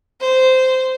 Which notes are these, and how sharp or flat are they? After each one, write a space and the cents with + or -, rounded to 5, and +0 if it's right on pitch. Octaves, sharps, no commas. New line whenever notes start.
C5 -15